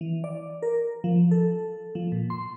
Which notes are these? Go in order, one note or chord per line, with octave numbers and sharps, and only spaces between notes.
E3
D5
A#4
F3
A4
F3
A#2
C6